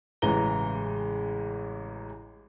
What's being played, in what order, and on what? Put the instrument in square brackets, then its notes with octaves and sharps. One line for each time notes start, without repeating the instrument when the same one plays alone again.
[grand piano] A1 C#3 E3 G#3 A#5 G7